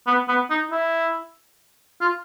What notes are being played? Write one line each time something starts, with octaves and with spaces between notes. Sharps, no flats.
B3
B3
D#4
E4
F4